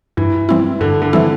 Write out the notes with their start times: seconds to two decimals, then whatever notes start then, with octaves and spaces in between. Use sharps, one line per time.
0.17 G2 E3
0.49 E3 G3 C4 E4
0.81 G2 D3
1.02 D3
1.13 E3 G3 C4 E4